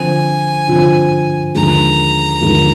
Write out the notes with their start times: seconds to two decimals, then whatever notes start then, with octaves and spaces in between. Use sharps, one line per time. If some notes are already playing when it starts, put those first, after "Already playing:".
Already playing: D3 F3 C4 F4 G#5
0.68 D3 F3 C4 F4
1.55 D#2 D3 F3 G#3 A#5
2.41 D#2 D3 F3 G#3